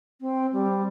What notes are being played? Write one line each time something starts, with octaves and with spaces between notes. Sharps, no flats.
C4
G3